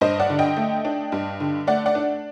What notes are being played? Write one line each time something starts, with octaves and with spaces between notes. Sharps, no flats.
G2 C5 D#5
D5 F#5
D3
D#5 G5
A3
D4
G2
D3
A3 D5 F#5
D5 F#5
D4